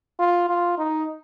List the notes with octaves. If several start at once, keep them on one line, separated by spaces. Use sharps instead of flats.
F4
F4
D#4